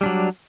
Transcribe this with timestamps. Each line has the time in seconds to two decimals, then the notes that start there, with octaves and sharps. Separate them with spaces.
0.01 G3
0.03 D4
0.06 F#3